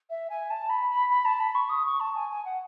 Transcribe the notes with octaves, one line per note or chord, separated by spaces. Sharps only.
E5
G#5
A5
B5
B5
B5
A5
B5
C#6
D#6
C#6
A5
G#5
G#5
F#5